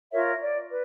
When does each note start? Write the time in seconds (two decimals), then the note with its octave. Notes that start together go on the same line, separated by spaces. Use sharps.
0.11 F4 A#4 C#5 E5
0.39 D5
0.67 B4